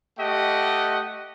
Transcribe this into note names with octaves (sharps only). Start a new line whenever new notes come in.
A3 G4 D#5 F#5